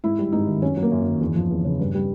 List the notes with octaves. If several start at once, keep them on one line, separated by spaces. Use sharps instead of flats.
G#2 E4
G3
G#2 D#4
D#3
F#2 C#4
F#3
A#3
F#2
D#3
E2
F3
E2
C#3
G2
G3